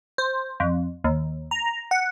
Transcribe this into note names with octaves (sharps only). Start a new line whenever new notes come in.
C5
F2
D#2
A#5
F#5